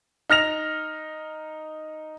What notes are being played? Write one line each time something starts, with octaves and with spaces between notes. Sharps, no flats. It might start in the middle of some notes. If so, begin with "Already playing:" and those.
D#4 F6 A#6 F7